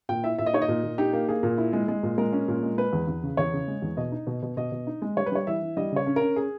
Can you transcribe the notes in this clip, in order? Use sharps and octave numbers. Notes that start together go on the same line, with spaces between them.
A#2 G5
E4 E5
A#2 E5
D#5
D#4 C#5
D#5
A#2
A#2
D#4 G4
A#3
A#3 G#4
A#2
E4
G#3
G#3
A#2
G#3 A#4
C#4
A#2
G#3
G#3 B4
E2
E2
C#3
E2 C#5
C#3
G#3
E2
B2 D#5
D#4
B2
B2
B2 D#5
B2
D#4
G#3
G3 C#5
B4
G3 C#5
E3 E5
E3
G3 D#5
C#3 C#5
C#4
A#4
C#4
G#4